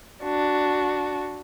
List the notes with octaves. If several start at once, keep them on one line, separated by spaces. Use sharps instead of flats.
D4 F#4